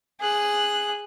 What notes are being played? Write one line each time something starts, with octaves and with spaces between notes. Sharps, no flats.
G#4 F#6